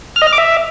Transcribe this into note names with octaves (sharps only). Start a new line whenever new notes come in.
F6
D#5
F6
D6
E5